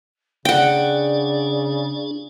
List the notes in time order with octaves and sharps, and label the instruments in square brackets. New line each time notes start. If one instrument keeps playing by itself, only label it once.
[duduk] C#3 [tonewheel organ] D4 G#4 [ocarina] D5 [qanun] F#5 G5